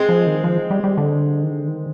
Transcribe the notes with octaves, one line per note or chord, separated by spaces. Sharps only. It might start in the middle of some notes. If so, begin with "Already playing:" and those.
Already playing: G#3 C4
F3
D#3
F3
G3
G3
D3
D#3
D3
D#3